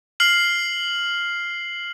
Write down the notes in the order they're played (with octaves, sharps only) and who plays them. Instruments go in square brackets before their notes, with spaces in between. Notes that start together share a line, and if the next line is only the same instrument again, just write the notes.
[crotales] F6 C7 F#7